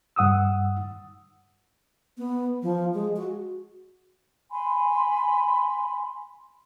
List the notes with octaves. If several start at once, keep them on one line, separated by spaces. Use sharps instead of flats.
G2 F#5 D#6 E6
B3
F3
G#3
F#4
G#5 B5 C6